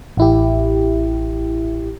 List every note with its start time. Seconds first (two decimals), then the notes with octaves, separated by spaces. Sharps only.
0.17 A1 E4 G4